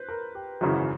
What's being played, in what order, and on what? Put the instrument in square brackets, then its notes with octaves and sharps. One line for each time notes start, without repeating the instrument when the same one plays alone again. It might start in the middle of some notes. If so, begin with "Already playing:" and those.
Already playing: [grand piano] B4 C5
A#4
G4
[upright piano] G#1 F#2 C#3 E3 [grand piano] F#4